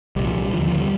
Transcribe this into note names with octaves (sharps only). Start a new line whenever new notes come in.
C2 A#2 G3
F3
G3
D#2 D3 F3
F3
G3